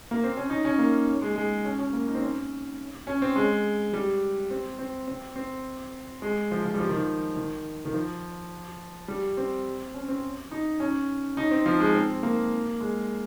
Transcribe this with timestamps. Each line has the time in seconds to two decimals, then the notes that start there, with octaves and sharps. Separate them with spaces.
0.11 A#3
0.24 C4
0.37 C#4
0.50 D#4
0.65 C#4
0.79 A#3
1.22 G#3
1.36 G#3
1.65 C#4
1.79 C#4
1.93 A#3
2.08 D#4
2.15 C4
2.21 C#4
3.07 C#4
3.22 C4
3.36 G#3
3.93 G3
4.51 C4
4.79 C4
5.07 C4
5.36 C4
6.22 G#3
6.51 F3
6.65 F3
6.74 G3
6.79 F3
6.89 D#3
6.98 F3
7.36 D#3
7.85 D#3
7.93 F3
9.08 G3
9.37 C4
9.94 C#4
10.08 C4
10.51 D#4
10.80 C#4
11.37 D#4
11.51 C4
11.66 F3
11.80 G#3
11.94 C4
12.23 A#3
12.80 G#3